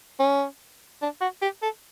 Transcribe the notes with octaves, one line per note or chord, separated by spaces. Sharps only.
C#4
D4
F#4
G4
A4